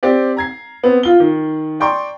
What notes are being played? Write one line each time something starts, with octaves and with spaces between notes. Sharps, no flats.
C4 G4 D5
A#5 G#6 C7
B3 C4
F4 G7
D#3
D5 G5 A#5 C6 C#6